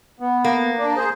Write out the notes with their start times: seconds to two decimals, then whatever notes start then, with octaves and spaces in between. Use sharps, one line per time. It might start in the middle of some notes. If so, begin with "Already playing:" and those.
0.20 B3
0.44 A#3
0.78 D4
0.97 G#4 C5